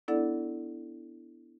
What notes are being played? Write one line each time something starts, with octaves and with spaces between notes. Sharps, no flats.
B3 D4 E4 A4 D5 F#5